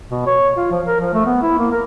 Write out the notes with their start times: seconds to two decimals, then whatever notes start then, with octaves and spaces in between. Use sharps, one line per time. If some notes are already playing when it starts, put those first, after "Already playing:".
0.11 B2
0.26 C#5
0.57 F4
0.71 F3
0.86 A#4
1.00 F3
1.14 A3
1.25 B3
1.42 E4
1.58 A#3
1.71 A#4